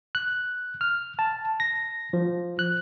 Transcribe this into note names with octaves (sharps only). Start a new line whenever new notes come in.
F#6
F6
A5
A#6
F3
F#6